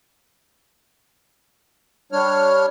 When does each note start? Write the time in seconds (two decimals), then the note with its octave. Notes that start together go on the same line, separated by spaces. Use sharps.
2.12 G3 D4 C#5 F6